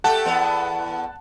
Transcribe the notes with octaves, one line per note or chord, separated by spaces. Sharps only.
A3 G4 F#5 A5
E2 B3